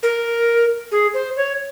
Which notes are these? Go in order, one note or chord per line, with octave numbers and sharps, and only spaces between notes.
A#4
G#4
C5
C#5